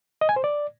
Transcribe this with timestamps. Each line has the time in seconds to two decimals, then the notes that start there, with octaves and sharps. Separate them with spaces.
0.21 D#5
0.29 G#5
0.36 C5
0.44 D5